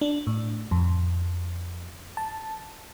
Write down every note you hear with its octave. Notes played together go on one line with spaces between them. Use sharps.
D4
A2
F2
A5